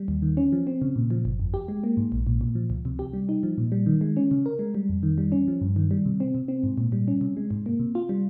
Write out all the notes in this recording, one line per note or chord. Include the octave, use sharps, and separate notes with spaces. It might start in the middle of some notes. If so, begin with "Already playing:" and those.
Already playing: G3
D#2
D#3
C#4
F3
C4
C#3
A#2
F3
G1
F2
G4
G#3
A#3
G#2
A#1
A#2
A#2
F3
C#2
C3
G4
G3
D#4
F3
A#2
G3
D#3
G#3
C#4
C#3
A#4
G#3
G3
F2
D#3
G3
C#4
F3
G2
D#3
G3
C3
C4
C3
C4
G#2
A#2
G3
C#4
C3
G#3
G#2
A#3
C3
F4
G3